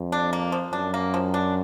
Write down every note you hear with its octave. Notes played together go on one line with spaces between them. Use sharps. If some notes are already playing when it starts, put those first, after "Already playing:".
Already playing: F2
D4
A#3
F3
F#2 D4
A#3
F3
D4